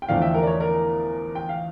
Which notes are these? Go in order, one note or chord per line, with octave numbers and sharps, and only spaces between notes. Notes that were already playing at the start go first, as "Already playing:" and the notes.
G5
E2 D3 F3 A3 D5 F5
E5 G5
A#4
D5
C#5
A#4 D5
G5
F5